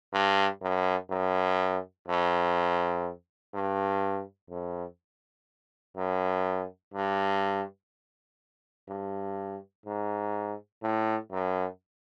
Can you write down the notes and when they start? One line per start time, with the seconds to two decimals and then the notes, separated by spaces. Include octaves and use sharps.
0.13 G2
0.62 F#2
1.10 F#2
2.08 F2
3.54 G2
4.50 F2
5.97 F#2
6.94 G2
8.88 G2
9.86 G#2
10.82 A2
11.31 F#2